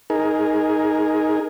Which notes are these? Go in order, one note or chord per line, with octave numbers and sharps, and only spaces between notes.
D#4 G#4 A#4